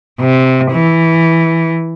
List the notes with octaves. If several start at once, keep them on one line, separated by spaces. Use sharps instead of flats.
C3
E3